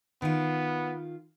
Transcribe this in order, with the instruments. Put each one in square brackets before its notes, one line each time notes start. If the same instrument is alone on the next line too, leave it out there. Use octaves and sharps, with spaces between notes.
[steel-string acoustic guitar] D#3 F4 [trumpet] B3